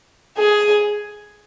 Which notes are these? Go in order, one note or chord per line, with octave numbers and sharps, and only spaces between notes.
G#4